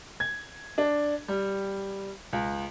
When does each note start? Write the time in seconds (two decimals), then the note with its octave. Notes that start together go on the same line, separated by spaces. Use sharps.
0.20 G#6
0.78 D4
1.28 G3
2.33 C#2